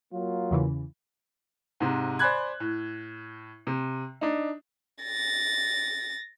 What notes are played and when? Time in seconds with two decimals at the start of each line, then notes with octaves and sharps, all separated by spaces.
0.12 F#3 A#3 F4
0.51 E2 C#3 E3
1.80 G#2 C3
2.19 C5 D5 G#5 B5 F#6 G#6
2.60 A2
3.67 C3
4.21 D4 D#4
5.03 A6 A#6